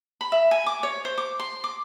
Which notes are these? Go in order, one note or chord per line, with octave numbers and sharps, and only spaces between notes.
B5
E5
G#5
D6
C#5
C5
D6
C6
D6